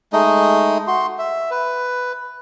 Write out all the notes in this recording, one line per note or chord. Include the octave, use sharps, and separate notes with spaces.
G#3 A3 D#4 D#5
F#4 C6
E5
B4